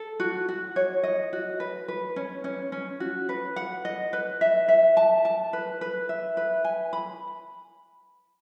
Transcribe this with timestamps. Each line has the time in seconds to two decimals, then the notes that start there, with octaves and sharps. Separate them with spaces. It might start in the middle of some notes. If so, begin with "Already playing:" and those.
Already playing: A4
0.20 F#4
0.49 F#4
0.76 C#5
1.03 D#5
1.33 F#4
1.60 B4
1.88 B4
2.16 C#4
2.44 C#4
2.72 C#4
3.00 F#4
3.29 B4
3.56 F#5
3.85 D#5
4.13 B4
4.41 E5
4.68 E5
4.97 A5
5.25 A5
5.53 B4
5.81 B4
6.09 E5
6.37 B4
6.65 G#5
6.93 B5